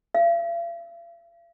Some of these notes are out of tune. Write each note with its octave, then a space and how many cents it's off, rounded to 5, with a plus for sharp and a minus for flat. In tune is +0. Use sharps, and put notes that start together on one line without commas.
F5 -45